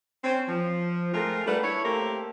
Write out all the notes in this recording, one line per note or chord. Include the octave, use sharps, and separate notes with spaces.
C4 C#4
F3
G#3 A3 C4 F4 A#4
G3 A3 A#3 D4 B4 F#5
E4 A4 B4 C#5
A3 A#3 C4 G4 A4 A#4